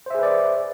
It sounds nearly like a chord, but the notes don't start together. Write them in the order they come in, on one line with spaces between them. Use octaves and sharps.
C5 E5 G#4 B4 D5